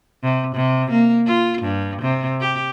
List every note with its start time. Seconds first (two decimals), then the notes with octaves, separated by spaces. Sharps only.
0.23 C3
0.55 C3
0.91 A#3
1.26 F4
1.62 G2
2.01 C3
2.40 G4